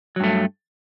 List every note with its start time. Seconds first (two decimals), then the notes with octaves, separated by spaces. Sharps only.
0.16 F#3
0.20 G2
0.24 A3